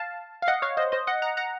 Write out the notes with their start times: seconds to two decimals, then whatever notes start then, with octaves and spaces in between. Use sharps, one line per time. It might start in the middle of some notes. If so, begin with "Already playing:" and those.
Already playing: F5 A5
0.42 F5
0.48 D#5 F#5
0.62 C#5 F5
0.77 C5 D#5
0.92 C5 D#5
1.07 D#5 F#5
1.22 F#5 A#5
1.37 F#5 A#5